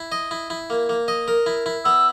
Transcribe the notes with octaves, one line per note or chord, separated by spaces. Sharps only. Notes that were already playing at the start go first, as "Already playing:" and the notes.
Already playing: E4
D#5
E4
E4
A#3
A#3
D#5
A#4
E4
E4
B3 E6